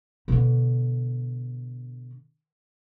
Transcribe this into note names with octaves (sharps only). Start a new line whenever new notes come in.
B2 D3